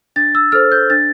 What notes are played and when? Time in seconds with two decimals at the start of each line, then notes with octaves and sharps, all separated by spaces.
0.16 D4 A6
0.35 E6
0.52 A4 C5 F6
0.72 G6
0.90 D4 A6